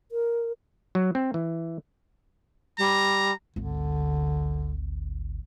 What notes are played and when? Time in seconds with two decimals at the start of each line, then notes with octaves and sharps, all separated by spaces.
0.12 A#4
0.95 F#3
1.15 C4
1.34 E3
2.79 G3 A#5
3.56 G#1 D2 D3